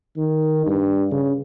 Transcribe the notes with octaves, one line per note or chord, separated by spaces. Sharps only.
D#3
G2
C#3